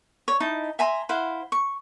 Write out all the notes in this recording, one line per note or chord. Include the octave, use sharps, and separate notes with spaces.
C#5
D#4 E4 A5
E5 G#5 A#5 C6
E4 C5 F5 F#5
C#6